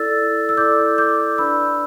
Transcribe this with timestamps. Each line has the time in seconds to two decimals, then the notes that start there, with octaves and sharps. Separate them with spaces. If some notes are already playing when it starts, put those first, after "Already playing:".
Already playing: E4 A4 D5 E6 A6
0.49 E6
0.57 E4 A4 D5 D6 G6
0.98 D6 G6
1.38 D4 B4 D5 B5 E6